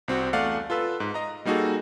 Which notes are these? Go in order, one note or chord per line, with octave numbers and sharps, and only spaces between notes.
C2 C4 F#4
E2 A3 D5 F5 F#5
F4 A4 B4 E6
G#2
D#5 A#5
G3 A#3 D#4 F#4 G#4 A4